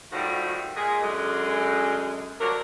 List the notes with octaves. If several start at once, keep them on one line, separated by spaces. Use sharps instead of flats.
D2 A2 D#3 F3 G3 F#4
A#2 G#3 G#4
F#2 D3 G#3
D2 F#3 G3 A#3 D4 A#4